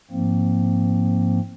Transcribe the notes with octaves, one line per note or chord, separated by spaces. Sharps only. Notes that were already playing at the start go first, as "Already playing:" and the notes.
G#2 F3 A#3 C4